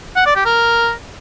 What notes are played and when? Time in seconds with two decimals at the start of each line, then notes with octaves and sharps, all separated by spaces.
0.16 F#5
0.26 D5
0.36 G4
0.46 A#4